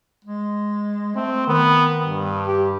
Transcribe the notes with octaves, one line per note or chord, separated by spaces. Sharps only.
G#3
A3 C4
D#3 B3
G2
G4